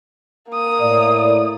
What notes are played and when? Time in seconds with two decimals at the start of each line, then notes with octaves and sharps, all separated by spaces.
0.50 A#3 D#6
0.80 A2 D5